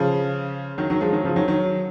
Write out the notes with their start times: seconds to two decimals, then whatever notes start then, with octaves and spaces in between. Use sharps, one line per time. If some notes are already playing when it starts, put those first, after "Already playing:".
Already playing: C#3 F3
0.78 D#3 F#3
0.90 D#3 F#3
1.01 F3 G#3
1.12 D#3 F#3
1.24 C#3 F3
1.36 D#3 F#3
1.48 D#3 F#3